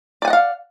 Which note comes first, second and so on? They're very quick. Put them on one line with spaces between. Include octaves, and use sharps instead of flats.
D5 G#5 F#5 D#5 F5